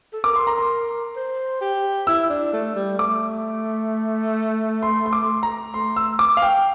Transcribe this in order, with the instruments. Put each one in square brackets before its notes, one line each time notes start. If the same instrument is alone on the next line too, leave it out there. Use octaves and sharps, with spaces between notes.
[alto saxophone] A4
[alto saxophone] A#4 [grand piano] D6
[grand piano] C6
A#5
C6
[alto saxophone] C5
G4
[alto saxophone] E4 [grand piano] E6
[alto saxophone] D4
A3
G3
[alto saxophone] A3 [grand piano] D6
[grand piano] C6
C6
D6
A#5
[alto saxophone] A3 [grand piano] C6
[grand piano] E6
D6
F5
G5